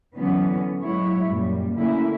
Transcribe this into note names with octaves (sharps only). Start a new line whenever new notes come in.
D3 E3 F#3 B3 C#4
F#3 G#3 E4 C#5
F#2 A#2 G3
D3 A3 A#3 C#4 E4